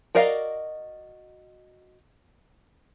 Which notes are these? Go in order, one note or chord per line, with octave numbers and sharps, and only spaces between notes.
F#4 A#4 D5 D#5 F5